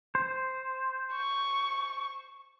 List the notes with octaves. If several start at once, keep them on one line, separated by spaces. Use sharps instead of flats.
C5
C#6